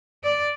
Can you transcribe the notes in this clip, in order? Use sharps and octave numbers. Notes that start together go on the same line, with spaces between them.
D5